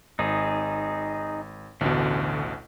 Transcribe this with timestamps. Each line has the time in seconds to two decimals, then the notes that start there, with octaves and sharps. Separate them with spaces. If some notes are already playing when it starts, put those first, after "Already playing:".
0.19 G#1 D#4 G#4
1.81 A1 D2 B2 D3